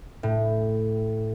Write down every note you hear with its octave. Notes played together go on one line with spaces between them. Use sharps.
A2